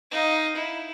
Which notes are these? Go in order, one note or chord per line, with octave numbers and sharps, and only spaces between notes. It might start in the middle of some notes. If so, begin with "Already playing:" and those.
D#4 F5
E4